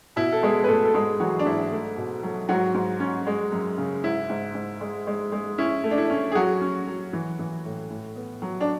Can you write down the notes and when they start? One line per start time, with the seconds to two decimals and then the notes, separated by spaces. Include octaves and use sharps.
0.16 B2 E4
0.32 A4
0.42 G#3 B3 G#4
0.64 B4
0.68 B2 A3 A4
0.85 A4
0.94 G#2 G#3 G#4
1.20 E3 F#3 F#4
1.39 D4
1.45 G#2 E4
1.72 A3
1.97 B2
2.23 F#3
2.49 G#2 F#3 F#4
2.74 G#2
3.00 C#4
3.27 G#3
3.52 F#2
3.78 C#3
4.03 G#2 E4
4.30 G#2
4.55 G#2
4.81 G#3
5.07 G#3
5.32 G#3
5.58 C#4 E4
5.84 A3
5.91 D4
5.98 E4
6.10 C#4
6.32 G#4
6.35 F#3 F#4
6.61 C#4
6.87 F#3
7.13 E3
7.39 E3
7.65 A2
7.90 A2
8.16 B3
8.42 F#3
8.61 D4